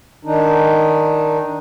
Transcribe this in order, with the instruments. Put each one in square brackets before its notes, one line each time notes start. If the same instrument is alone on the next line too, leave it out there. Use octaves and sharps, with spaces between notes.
[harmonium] D#3 D4 D#4